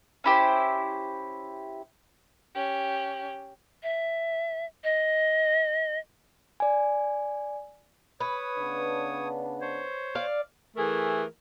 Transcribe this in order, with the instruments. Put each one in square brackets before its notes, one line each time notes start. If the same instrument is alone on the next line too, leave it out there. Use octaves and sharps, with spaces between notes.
[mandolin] C#4 E4 G4 C5
[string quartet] C#4 G4
[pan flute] E5
D#5
[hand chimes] D5 G#5
[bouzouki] B4 [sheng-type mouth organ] C#5 D#6
[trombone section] C#3 B3 D4
[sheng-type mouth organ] C5 C#5
[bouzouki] D5 F5
[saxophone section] E3 A3 G#4 A#4